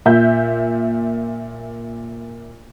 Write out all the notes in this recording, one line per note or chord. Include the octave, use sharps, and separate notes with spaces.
A#2 E5 G6